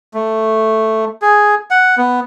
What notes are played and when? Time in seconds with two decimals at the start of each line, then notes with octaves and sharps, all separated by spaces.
0.14 A3
1.22 G#4
1.71 F#5
1.98 B3